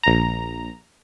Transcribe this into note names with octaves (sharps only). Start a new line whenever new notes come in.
A#1 A#5